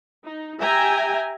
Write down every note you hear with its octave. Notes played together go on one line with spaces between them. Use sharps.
D#4
G4 E5 G5 G#5 A#5